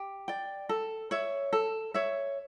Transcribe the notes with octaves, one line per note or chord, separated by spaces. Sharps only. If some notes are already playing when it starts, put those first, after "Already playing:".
Already playing: G4
D5 G5
A4
C#5 E5
A4
C#5 E5